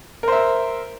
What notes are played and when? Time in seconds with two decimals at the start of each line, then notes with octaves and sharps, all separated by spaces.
0.23 A#4
0.28 C5
0.32 E5